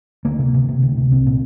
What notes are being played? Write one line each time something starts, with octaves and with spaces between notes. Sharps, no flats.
D2 A#3
C3
C3
C3
D2
C3
C2 C4
A#2